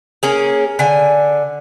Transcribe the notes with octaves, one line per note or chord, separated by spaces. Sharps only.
A#3 C#4 G#4
D3 G#5